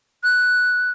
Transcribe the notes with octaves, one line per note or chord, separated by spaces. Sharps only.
F#6